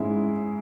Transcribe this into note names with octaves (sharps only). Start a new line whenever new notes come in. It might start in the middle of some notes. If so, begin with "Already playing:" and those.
Already playing: G#2 G#3 C#4 E4